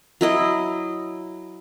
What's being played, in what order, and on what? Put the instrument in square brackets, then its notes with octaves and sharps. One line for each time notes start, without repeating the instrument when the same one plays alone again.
[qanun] F#3 E4 D#5